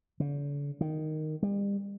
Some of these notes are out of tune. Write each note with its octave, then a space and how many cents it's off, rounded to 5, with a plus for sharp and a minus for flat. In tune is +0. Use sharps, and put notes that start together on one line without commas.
D3 -45
D#3 -5
G3 +40